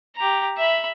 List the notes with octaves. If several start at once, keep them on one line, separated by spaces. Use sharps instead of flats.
G4 A#5
E5 B5